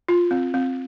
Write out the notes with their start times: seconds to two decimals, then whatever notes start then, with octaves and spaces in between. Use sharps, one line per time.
0.08 F4
0.31 C4
0.54 C4